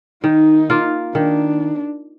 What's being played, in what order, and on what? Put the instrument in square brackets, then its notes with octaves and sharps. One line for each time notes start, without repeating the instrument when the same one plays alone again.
[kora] D#3 [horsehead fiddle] D#4
[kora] A#3 F4
[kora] D#3 [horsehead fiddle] D4